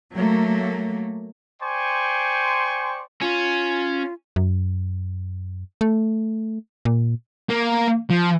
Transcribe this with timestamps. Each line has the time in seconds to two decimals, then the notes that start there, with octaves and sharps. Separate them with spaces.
0.14 F#3 A3 A#3
1.62 C5 D5 G5 G#5 C6 C#6
3.22 C#4 F4
4.36 F#2
5.81 A3
6.85 A#2
7.50 A#3
8.10 F3